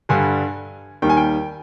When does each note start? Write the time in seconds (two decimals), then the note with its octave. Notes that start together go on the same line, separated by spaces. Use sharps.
0.09 G2 D3 G3 G#5
1.02 D#2 D#3 G3 G5
1.09 G#5
1.17 G5